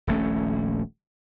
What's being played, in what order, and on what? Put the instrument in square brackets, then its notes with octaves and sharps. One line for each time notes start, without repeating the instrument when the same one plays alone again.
[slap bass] D#1 A#1 A3 C#4